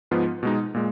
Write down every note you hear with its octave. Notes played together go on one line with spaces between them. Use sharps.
G#2 F3 B3 F4
B2 G#3 D#4
A#2 G#3